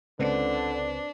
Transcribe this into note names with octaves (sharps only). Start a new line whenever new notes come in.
C#2 D3 C4 D4 B4 C5